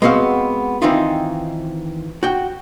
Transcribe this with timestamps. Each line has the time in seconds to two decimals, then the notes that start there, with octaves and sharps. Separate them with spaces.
0.02 G#3 B3 C4 F#4 F5
0.82 D#3 E3 C4 D#4 F4
2.23 F#4 G5